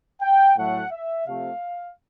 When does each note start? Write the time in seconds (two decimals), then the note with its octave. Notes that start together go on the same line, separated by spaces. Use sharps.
0.21 G5
0.57 A2 F#3 A3 F#5
0.91 E5
1.27 C3 F3 A3 F5